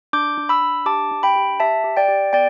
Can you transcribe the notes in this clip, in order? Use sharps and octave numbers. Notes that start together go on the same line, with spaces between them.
D4 D6 G6
D4
B5 E6
D4
G4 A5 D6
D4
G5 B5
G4
G4 E5 A5
G4
D5 G5
G4
B3 D5 G5